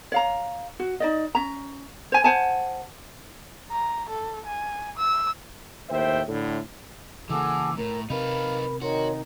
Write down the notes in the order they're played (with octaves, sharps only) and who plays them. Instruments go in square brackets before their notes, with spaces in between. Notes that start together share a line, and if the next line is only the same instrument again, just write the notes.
[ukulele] C#5 F5 A#5
F#4
D#4 D5 D#5
C#4 A#5
C5 G#5
C5 F#5 G#5 A5
[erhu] A#5
A4
G#5
E6
[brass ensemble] D#2 A2 C5 E5 G5
A2 D3
[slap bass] C#3 A#3 [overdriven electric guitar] E3 [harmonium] F#4 G#4 A4 [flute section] D6 E6
[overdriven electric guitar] A2 [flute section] A#4 [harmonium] A#5
[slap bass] C3 [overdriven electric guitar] D#4 B4 [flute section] A#4 B5 [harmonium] F5
[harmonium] D#3 D#4 [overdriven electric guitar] F#4 [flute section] A#4 C#5 C6